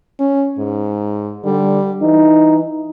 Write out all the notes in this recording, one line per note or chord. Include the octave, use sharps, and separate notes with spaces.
C#4
G#2
D3 G3
E3 D#4